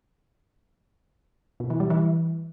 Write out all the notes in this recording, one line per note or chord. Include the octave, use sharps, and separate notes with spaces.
B2
E3
G3
E3